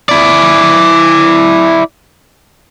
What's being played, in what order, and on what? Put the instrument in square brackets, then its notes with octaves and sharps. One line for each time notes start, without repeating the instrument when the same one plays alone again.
[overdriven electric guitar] E4 D5